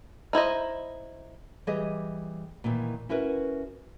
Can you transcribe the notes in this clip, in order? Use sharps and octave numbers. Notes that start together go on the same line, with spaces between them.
D#4 E4 C5 D#5
E3 G3 G4 G#4 D#5
A#2 D#3 E3
C#4 E4 F#4 A#4 B4